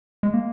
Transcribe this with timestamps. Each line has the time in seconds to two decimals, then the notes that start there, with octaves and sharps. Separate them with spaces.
0.23 G#3
0.34 A#3